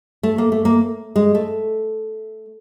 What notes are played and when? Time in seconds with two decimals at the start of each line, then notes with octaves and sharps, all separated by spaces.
0.23 A3
0.38 A#3
0.52 A3
0.65 A#3
1.16 G#3
1.35 A3